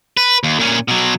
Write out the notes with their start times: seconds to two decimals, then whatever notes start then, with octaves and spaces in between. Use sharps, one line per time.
0.17 B4
0.43 D#2
0.59 A#2 C#4
0.88 B2 F#3